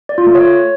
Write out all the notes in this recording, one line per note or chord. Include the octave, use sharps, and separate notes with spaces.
D5
F4
A3
C#5